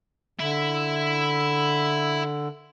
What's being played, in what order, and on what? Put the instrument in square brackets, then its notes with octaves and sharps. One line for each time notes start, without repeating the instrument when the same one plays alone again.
[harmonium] D3 [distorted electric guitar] E4 E5